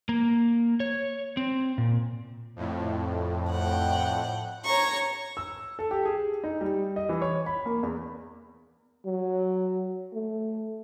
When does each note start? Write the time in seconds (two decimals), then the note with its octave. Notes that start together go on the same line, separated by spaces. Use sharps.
0.09 A#3
0.80 C#5
1.37 C4
1.78 A#2
2.56 F2 A2
3.52 F#5 G5
4.65 C#5 A#5 C#6
5.37 E6
5.79 A4
5.91 G4
6.05 G#4
6.44 D#4
6.61 G3
6.96 D#5
7.09 E3
7.22 C#5
7.46 B5
7.66 A#3
7.83 E2
9.06 F#3
10.13 A3